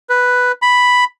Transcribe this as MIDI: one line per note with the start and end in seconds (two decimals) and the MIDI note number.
0.09 0.52 71
0.62 1.04 83